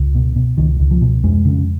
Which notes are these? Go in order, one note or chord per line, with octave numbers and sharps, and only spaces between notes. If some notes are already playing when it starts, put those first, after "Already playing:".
Already playing: C#2
B2
B2
C#2 D#3
C#2
F3
B2
F2 G#3
C#3